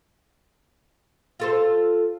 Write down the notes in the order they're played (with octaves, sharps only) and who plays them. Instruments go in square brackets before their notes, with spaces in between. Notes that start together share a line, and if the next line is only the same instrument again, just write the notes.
[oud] F4 A4 C5